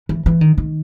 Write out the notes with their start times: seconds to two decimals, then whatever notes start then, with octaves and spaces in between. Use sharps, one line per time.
0.09 E3
0.26 E3
0.41 D#3
0.58 D#3